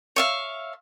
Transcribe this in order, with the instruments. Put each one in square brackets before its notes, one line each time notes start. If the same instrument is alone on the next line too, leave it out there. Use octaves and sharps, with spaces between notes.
[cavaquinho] C#5 E5 F5